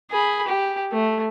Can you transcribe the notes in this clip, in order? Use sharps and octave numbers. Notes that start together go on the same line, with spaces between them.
G#4 B5
G4
A3